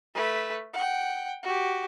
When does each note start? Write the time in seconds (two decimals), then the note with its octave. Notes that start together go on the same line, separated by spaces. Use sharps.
0.14 A3 B4
0.74 F#5 G5
1.43 F#4 G4